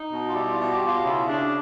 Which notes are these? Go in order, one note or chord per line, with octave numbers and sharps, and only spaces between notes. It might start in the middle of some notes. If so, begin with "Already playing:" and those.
Already playing: D#4
B2
F4
G3 E4
F4
B2
G4
B2
F4
C#3 E4
C#3 D4